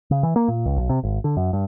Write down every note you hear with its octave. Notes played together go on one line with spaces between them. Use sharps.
C#3
E3
A#3
A#2
C#2
B1
C3
G#1
D3
F#2
G2